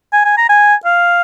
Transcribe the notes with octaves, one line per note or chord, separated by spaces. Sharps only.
G#5
G#5
A#5
G#5
F5